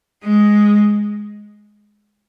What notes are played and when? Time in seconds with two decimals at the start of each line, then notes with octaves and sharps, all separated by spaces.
0.23 G#3